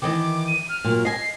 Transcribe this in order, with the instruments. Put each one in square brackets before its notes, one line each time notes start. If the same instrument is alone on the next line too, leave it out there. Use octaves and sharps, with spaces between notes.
[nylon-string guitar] D#3 E3 D#5 [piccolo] D6
[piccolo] D#7
F6
[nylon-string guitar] A#2 F#3
[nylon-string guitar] D#5 G#5 [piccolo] C7